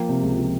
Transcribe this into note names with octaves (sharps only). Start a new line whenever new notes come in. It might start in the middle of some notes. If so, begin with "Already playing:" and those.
Already playing: F3 A#3 G5
C3
C#2
F3